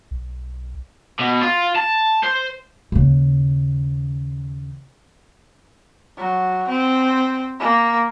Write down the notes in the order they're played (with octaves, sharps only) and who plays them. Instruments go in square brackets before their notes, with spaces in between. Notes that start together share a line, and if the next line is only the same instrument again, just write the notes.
[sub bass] B1
[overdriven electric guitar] B2
F4
A5
C5
[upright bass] D#2 C#3
[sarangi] F#3
C4
A#3